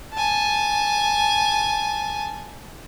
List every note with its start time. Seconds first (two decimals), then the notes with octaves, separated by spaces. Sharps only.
0.14 G#5 A5